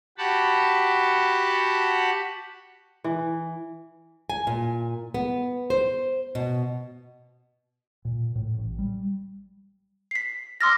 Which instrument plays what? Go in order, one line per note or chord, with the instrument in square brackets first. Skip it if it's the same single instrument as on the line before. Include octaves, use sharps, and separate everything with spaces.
[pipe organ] F#4 G4 F#5 A5 B5
[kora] E3
[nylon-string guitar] G#5
A#2
B3
C5
B2
[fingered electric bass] A#2
A2
A1
G3
[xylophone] B6 C7
C6 D6 E6 F6 A6 A#6